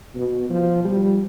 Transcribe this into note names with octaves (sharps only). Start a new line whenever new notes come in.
B2
F3
G3